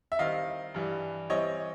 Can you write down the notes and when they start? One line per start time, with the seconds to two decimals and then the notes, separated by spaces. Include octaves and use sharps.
0.12 E5
0.19 D#3 G3 C4 E4 D#5 F5
0.74 G2 E3 G3
1.30 E3 G3 C4 E4 C#5 D#5